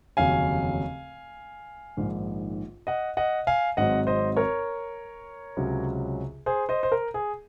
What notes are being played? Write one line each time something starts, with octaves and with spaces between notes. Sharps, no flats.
F1 D#2 C#3 F#3 C#4 F5 G#5
A#1 G#2 D#3
D#5 F#5
D#5 F#5
F5 G#5
G#1 G#2 F#3 C4 D#5 F#5
C5 D#5
A#4 C#5
C#2 C3 F#3 C#4
G#4 C5
C5 D#5
C5
A#4
G#4